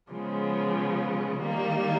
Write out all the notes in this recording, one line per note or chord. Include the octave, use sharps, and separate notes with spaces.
C#3 F3 G#3 B3
D#3 G3 A#3